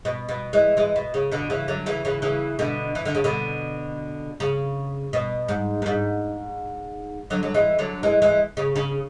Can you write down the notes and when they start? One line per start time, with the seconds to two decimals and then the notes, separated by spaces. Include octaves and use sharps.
0.05 B2
0.29 B2
0.53 E3 G#3
0.77 E3 G#3
0.96 B2
1.14 C#3
1.31 B2 D3
1.50 C#3 E3
1.68 D3 F#3
1.86 C#3 E3
2.05 C#3 E3
2.22 C#3 E3
2.59 B2 D3
2.95 E3
3.05 D3
3.15 C#3
3.24 B2 D3
4.40 C#3
5.13 B2
5.49 G#2
5.82 F#2
5.86 G#2
7.30 D3 F#3
7.43 F#3
7.54 E3 G#3
7.79 D3 F#3
8.03 E3 G#3
8.22 E3 G#3
8.57 C#3
8.75 C#3